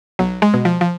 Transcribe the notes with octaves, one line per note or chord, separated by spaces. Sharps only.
B1 F#3
G#3
B2
F3
F3